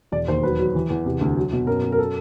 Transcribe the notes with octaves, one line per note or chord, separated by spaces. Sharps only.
E1 D5
D#2 C5
F#3 B4
F#3
E3
E2
C3
D2
F#3
B2
F#2 A#4
F#2
A#4
A4